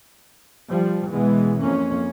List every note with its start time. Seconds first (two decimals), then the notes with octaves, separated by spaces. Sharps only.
0.70 F3 G3
1.11 B2 E3 G#3 B3
1.60 F2 A#3 C#4